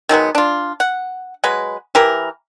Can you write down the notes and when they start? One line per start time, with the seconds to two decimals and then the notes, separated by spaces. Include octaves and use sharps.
0.09 D#3 F#3 G#3 B3
0.35 D4 F4
0.80 F#5
1.44 F#3 G#3 B4
1.95 E3 G4 A#4